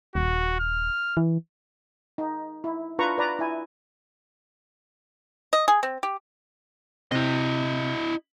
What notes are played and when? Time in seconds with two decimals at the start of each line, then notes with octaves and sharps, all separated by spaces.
0.15 D#1 F#4
0.60 F6
1.17 E3
2.18 D#4
2.64 E4
2.99 D4 F4 B4 A#5 C#6
3.18 B4 D5 A#5
3.39 E4 G#5
5.53 D#5
5.68 G#4
5.83 C4
6.03 G4
7.12 C3 E4 D#5